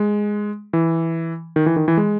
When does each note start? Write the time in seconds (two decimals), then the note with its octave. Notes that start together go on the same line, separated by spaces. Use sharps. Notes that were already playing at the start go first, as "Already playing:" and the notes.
Already playing: G#3
0.73 E3
1.56 D#3
1.66 E3
1.76 D#3
1.88 E3
1.97 G#3